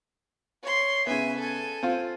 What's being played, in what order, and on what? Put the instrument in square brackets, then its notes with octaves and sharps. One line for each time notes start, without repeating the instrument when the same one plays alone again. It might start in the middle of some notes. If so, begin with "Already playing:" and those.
[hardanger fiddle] C#5 C6
[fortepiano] C#3 B3 [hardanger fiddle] E5 G#5
[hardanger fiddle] A4 G#5
[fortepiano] C4 F4